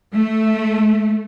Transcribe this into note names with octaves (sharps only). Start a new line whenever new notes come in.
A3